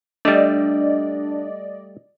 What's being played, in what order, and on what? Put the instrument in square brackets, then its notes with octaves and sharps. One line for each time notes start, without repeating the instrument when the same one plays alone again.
[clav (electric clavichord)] G3 A3 [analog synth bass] D4 [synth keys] D5 D#5